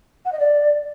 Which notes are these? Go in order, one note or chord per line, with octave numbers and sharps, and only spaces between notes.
F#5
D#5
D5